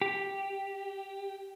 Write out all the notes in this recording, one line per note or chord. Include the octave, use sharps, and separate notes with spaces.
G4